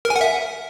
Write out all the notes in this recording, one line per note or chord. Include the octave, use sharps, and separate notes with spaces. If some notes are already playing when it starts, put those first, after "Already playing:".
A#4
G#5
F#5
E5